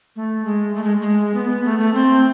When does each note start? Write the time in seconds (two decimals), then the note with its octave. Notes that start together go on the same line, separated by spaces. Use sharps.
0.16 A3
0.45 G#3
0.75 A3
0.84 G#3
1.02 G#3
1.35 B3
1.50 B3
1.65 A3
1.79 A3
1.94 C4